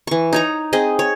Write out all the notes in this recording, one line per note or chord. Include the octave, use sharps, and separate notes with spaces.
E3 C#6
D#4 C#5 A#5
C4 G#4 D#5
C#5